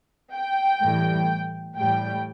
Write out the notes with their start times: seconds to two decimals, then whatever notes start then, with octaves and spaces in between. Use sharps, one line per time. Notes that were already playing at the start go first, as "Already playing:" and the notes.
0.34 G5
0.82 A2 E3 G3
1.77 A2 E3 G3 G5